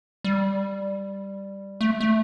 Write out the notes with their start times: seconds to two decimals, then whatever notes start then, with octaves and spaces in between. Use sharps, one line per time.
0.24 G3
1.81 A3
2.00 A3